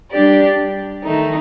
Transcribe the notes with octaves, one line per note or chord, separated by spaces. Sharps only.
G3 D4 G4 D5
D#3 A3 D#4